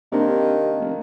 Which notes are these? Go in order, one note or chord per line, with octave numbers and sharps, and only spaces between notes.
C3 D#3 A#3 D4
F1